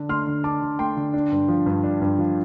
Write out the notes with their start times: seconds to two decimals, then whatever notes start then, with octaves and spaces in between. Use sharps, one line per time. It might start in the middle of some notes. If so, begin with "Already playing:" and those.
Already playing: D3 D4
0.09 A3 C6 F6
0.27 D3
0.44 D4 A5 D6
0.62 D3
0.79 A3 G5 C6
0.96 D3
1.13 D4
1.32 G2
1.48 F3
1.66 G2
1.84 D4
2.01 G2
2.19 F3